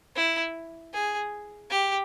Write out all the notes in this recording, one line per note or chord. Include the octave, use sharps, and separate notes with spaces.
E4
G#4
G4